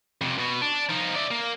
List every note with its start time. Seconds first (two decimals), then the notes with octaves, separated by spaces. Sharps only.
0.21 F2 C3
0.38 B2
0.62 D4
0.90 F3 D#4
1.16 D5 E5
1.31 A#3